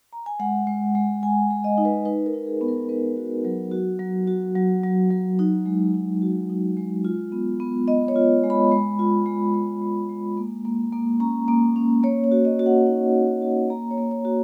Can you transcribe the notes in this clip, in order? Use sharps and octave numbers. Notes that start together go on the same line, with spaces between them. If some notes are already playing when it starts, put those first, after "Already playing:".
A#5
G#5
G#3 F#5
G#3
G#3
G#3 G#5
G#3
D#5
D#4
B4
D#4 B4
A#4
D#4
G#4
B3
A#4
B3 B4
F#4
F#3
F#4
F#3
F#4
F#3
F#3
F#3
D#4
G#3
D#4
F#4
D#4
G#3
F4
B3
B3
B3 D#5
C#5
F4
G#3
B5
G#3
F4
G#3
G#3 B5
G#3
G#3
A#3
A#3
A#3
C#4 A#5
A#3
C#4
A#3 C#5
C#5
F#4
D#5
F#4
F#5
D#4
A#3
F#4
A#3 A#5
C#5
A#3
C#5
F#4